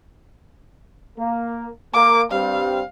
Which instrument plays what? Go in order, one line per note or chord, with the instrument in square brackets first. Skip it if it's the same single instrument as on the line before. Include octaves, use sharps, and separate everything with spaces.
[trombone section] A#3
[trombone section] A#3 [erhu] D6
[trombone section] G2 G3 C4 [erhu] F5